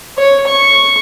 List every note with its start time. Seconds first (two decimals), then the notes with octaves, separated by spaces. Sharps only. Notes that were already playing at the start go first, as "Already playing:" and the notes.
0.17 C#5
0.47 C#6